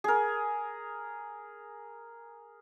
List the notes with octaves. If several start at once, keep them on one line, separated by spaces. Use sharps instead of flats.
G#4 A#4